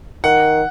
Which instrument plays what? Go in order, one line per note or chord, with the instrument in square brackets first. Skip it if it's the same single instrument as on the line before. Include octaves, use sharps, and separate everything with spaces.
[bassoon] D#3 [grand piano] F#5